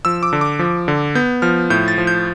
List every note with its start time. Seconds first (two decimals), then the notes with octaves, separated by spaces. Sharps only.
0.05 F3 E6
0.23 D6
0.33 D3
0.41 D6
0.59 F3
0.88 D3
1.15 B3 G6
1.42 F3 F6
1.70 A2 G6
1.88 A6
1.98 F3
2.07 G6